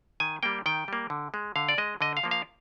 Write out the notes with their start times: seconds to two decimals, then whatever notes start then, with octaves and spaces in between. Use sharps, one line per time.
0.20 D#3 G#5
0.43 G3 A#3 G5
0.66 D#3 G5
0.88 G3 A#3
1.10 D3
1.34 G#3
1.56 D3 F5
1.69 D5
1.78 G#3 D#5
2.01 D3 D#5
2.17 F5
2.24 F3 A#3
2.31 F5